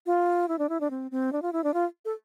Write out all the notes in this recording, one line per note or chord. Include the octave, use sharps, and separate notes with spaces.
F4
E4
D4
E4
D4
C4
C4
D4
F4
E4
D4
F4
A4